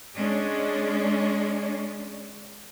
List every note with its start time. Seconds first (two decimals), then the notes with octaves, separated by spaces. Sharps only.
0.14 G#3 C#4 D4